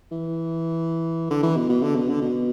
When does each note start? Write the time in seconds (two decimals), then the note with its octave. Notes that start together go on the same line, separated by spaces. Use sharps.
0.12 E3
1.30 D3
1.43 E3
1.56 B2
1.69 B2
1.82 D3
1.96 B2
2.09 D3
2.22 B2